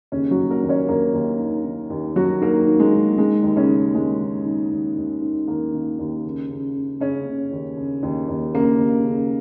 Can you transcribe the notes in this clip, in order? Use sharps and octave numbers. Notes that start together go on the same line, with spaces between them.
D#2 C#3 C#4
F#3 F#4
D#2
A#3 A#4
D#2
C#4 C#5
D#2 A#3 A#4
D#2
D#3
D#3
D#2
D#3 F#3 F#4
D#3 A#3 A#4
D#3
G#3
D#3
D#3 G#3
D#2
C#3 C#4
D#3
D#2 G#3
D#3
D#3
D#2
D#2
D#3
D#2 A#3
D#3
D#2
C#3
C#3
C#3
C#3 C#4
C#3
D#2
C#3
D#2
D#2
C#3 A#3
D#2
C#3